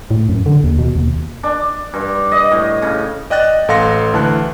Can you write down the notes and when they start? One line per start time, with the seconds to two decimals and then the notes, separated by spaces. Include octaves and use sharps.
0.11 A2
0.29 F#2
0.46 D3
0.64 D#2
0.78 B2
0.96 D#2
1.43 D4
1.94 G2
2.32 D#5
2.52 A2
2.82 C#3
3.30 D5 D#5 G5 F#6 A6
3.68 A1 A4 F5 C6 A#6 C#7
4.14 D2 E3 A5 F#6